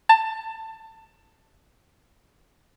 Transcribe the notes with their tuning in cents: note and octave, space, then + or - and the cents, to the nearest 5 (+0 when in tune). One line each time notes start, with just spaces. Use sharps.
A5 +20